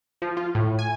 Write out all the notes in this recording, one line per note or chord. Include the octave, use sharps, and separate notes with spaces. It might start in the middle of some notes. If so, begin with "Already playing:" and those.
F3
F4
A2
G#5